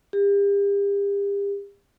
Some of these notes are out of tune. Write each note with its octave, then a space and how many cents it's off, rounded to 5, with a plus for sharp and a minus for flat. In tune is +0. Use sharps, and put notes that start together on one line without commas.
G4 +40